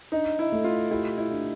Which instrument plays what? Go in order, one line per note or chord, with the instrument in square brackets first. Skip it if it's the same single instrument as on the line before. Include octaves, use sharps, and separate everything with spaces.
[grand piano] D4 [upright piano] D#4
[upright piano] E4
[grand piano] A3
[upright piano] F4
[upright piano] E4 [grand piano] G4
[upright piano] E4
[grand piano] D4